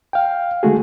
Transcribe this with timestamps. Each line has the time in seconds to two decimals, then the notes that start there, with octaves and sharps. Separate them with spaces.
0.13 F5 G5
0.63 D3 G#3 A3 F#4 G#4